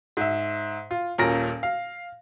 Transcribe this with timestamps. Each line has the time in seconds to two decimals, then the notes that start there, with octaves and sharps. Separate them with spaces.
0.17 G#2 E5
0.91 F4
1.18 D#1 A#2 C#4 A#4 A#6
1.63 F5